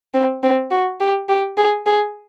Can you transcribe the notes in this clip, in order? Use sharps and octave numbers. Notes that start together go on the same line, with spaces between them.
C4
C4
F#4
G4
G4
G#4
G#4